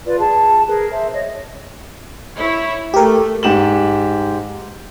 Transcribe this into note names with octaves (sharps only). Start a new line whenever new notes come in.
F4 B4 D5
G#4 A5
G#4 A#4 B4
C5 E5
C#5 D#5
E4 C#5
A3 G4 A#4
G#2 G4 E7 F#7